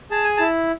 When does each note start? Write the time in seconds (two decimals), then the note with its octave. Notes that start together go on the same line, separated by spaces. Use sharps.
0.11 G#4 A5
0.24 G#5
0.37 E4 A5